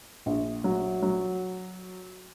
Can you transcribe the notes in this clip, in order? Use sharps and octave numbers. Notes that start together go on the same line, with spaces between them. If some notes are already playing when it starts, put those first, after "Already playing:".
A#1
F#3
F#3